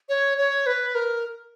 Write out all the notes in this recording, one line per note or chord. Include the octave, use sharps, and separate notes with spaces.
C#5
C#5
B4
A#4